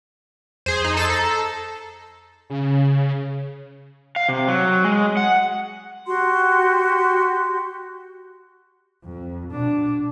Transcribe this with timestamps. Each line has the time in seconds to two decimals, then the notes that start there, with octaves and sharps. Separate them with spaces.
0.66 F2 G#4 C5
0.85 D#4
0.97 A4 C5 E7
1.10 A4 A#5 A#6
2.50 C#3
4.16 F5
4.29 C3
4.48 F#3
4.84 G#3
5.17 F#5
6.08 F#4 G4 C6
9.05 F2
9.51 B2 D4